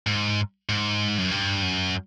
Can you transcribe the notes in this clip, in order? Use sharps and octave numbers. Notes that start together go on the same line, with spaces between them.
G#2
G#2
F#2
G2
F#2